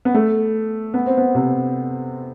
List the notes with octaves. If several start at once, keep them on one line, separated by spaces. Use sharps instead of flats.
B3
A3
B3
C4
B3
C3